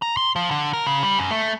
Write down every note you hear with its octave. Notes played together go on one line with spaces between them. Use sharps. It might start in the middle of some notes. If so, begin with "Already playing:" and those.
A#5
C6
F3
D3
A#4
C#3
G3
F#2
A3